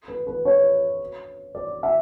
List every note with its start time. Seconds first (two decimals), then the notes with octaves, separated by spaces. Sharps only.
0.08 B4
0.27 B4
0.45 C#5
1.55 D5
1.83 E5